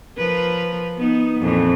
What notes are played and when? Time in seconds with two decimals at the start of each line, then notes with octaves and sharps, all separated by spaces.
0.17 F3 A#4 B4
0.97 B3 D#4
1.40 F2 A#2 E3